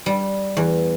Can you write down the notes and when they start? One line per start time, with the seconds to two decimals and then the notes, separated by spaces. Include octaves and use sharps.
0.06 G3
0.57 E2